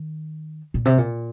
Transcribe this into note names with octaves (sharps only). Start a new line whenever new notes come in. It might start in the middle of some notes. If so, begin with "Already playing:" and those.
Already playing: D#3
A#2
C3
A#2